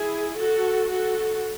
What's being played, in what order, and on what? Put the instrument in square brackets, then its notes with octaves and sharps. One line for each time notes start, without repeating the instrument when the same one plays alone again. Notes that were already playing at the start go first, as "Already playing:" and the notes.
Already playing: [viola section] E4 G#4
F#4 A4
F#4 A4